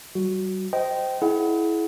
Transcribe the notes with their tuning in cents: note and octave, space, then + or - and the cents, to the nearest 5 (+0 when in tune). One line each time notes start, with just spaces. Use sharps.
G3 -40 F#4 +0
C5 -10 D#5 +0 G5 -20
E4 +0 G#4 +35 F#5 +0